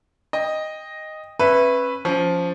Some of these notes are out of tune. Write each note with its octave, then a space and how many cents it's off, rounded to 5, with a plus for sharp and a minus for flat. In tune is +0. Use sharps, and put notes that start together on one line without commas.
D#5 +0 G5 +25
C#4 -30 B4 +0 E5 +5
F3 +0 C#4 +20